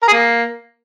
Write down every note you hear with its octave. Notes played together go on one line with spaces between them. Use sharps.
A#4
G#4
A#3